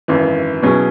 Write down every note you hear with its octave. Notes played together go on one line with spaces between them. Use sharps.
G#1 F#2 E3
B2 F#3 C#4 E4 G#4